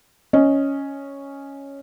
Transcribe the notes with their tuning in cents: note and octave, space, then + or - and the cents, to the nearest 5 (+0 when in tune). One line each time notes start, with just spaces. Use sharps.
C#4 +0 D#5 +0